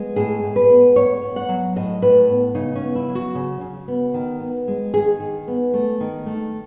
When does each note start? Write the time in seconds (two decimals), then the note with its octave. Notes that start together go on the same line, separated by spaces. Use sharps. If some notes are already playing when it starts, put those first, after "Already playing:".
Already playing: G#3 B3
0.16 A2 G#4
0.43 A2
0.56 B4
0.70 B3
0.96 A2 C#5
1.23 B3
1.36 F#5
1.49 F#3
1.76 A2 D#5
2.02 A2 B4
2.29 B3
2.55 C#3 D#4
2.75 C#4
2.81 B3
2.95 E4
3.09 F#3
3.15 F#4
3.35 C#3
3.61 C#3
3.88 B3
4.14 D#3
4.40 B3
4.68 G#3
4.94 D#3 G#4
5.20 D#3
5.48 B3
5.74 A3
6.00 D#3
6.26 A3